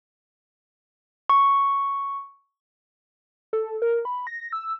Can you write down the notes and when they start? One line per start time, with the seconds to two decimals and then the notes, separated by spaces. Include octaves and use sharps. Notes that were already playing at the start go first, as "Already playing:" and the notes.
1.30 C#6
3.53 A4
3.82 A#4
4.05 B5
4.27 A#6
4.53 E6